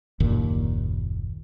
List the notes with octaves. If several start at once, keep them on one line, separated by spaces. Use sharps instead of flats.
F#1 D#2 A#2